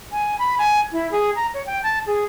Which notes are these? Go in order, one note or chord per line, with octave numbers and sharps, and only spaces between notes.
G#5
B5
G#5
E4
G#4
A#5
C#5
G5
A5
G#4